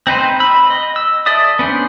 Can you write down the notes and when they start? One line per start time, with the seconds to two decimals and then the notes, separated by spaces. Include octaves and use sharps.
0.07 C4 D#4 B4 C5
0.40 B5 E6
0.70 D#5
0.96 E6
1.26 A4 D5 E5 D#6
1.59 B3 C#4 D4 C5